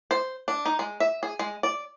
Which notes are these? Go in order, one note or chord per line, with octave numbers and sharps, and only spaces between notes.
C5
D4
D#4
G#3
E5
G#4
G#3
D5